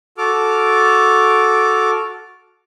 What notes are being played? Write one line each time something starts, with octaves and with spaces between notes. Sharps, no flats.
F#4 A4 D6 F6